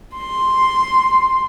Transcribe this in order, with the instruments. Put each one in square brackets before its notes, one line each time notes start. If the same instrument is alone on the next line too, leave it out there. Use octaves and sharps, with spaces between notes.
[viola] C6